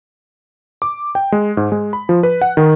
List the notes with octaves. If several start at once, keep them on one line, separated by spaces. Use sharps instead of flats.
D6
G5
G#3
G#2
G#3
B5
F3
B4
F#5
D#3